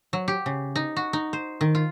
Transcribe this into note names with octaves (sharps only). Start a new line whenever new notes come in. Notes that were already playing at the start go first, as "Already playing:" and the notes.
F#3
G4
C#3
D#4
F#4
D#4
C5
D#3
F4